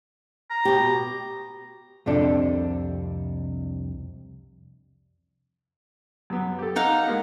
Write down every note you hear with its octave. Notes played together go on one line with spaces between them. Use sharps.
A#5
B2 G4
C2 F2 C3 D4 A4
F#2 B3
G4 A4
D#4 F5 F#5
G#3 A#3 B3